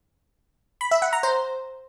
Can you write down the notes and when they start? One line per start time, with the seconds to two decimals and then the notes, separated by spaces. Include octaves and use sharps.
0.81 B5
0.91 E5
1.02 F#5
1.13 A#5
1.23 C5